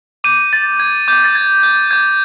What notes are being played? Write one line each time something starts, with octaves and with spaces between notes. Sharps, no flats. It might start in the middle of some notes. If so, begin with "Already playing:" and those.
D6 G6 D#7
A6
G#6
D6 G6
A6
G#6
G6
D6 G6 G#6